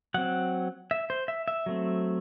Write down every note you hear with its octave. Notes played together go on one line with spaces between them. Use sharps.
F#3 C4 F#5
E5
C5
E5
E5
F#3 A3 C4